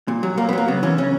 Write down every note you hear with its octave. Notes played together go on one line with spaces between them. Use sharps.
A#2
F#3
A#2 A#3
B3
F#3 A#3
C#3 B3
E3 C#4
C#3 C#4